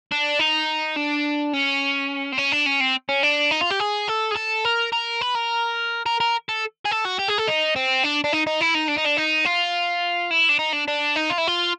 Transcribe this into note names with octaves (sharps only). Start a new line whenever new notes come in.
D4
D#4
D4
C#4
C4
C#4
D4
C#4
C4
C#4
D4
D#4
F4
G4
G#4
A4
G#4
A4
A#4
A#4
B4
A#4
A#4
A#4
A4
G#4
A4
F#4
G4
G#4
A4
D#4
C4
D4
D4
D#4
D#4
E4
D#4
D4
D#4
D4
D#4
F4
E4
D4
D#4
D4
D4
D#4
F4
E4
F4